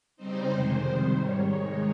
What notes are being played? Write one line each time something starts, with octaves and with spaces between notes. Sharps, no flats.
C#3 G3 C4 D#4 C5
F2 C3 D#3 G#3 C5
C3 D#3 G3 C5
G#2 D#3 G3 C#5
D#3 G#3 D#4